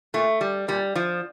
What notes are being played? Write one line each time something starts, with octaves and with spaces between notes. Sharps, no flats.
A#2 A3
G3
A#2 G3
F3